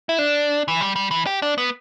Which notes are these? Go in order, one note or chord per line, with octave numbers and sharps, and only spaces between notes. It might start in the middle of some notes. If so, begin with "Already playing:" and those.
E4
D4
E3
G3
G3
E3
G4
D4
B3